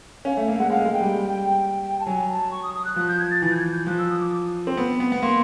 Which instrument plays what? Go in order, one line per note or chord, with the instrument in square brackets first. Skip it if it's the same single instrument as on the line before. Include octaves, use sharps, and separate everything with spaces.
[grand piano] C#4 [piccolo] F5
[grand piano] A3 [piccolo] E5
[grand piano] A#3 [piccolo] F5
[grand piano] G#3 [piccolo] F#5
[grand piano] G#3 [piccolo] F5
[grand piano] G#3
[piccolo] G5
[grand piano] G3
[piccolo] A5
[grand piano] F#3 [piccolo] G#5
[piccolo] A5
C#6
D#6
D#6
F#6
[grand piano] F3 [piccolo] F#6
[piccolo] G6
G#6
A6
[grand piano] E3 [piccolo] A6
[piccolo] G6
G#6
G6
[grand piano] F3 [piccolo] F#6
[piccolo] E6
D#6
D6
[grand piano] C4
B3
B3
B3
[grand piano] A#3 [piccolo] C6